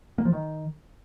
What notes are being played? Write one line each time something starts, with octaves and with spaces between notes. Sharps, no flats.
A#3
F3
D#3